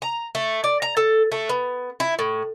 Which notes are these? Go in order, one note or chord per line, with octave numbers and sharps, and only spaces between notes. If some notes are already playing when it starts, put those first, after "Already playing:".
A#5
A3
D5
A#5
A4
A3
B3
E4
A2